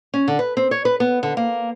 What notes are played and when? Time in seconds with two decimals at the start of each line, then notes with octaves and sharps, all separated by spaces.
0.14 C#4
0.28 D3
0.39 B4
0.57 C4
0.71 C#5
0.85 B4
1.00 B3
1.23 D3
1.37 A#3